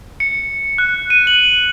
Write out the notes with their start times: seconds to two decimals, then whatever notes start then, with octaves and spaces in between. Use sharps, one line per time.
0.20 C#7
0.78 F#6
1.10 D#7
1.27 F#7